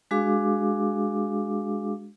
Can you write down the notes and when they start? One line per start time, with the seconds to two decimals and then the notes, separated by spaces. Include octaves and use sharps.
0.11 G#3 D4 F#4 G#4 F5 D6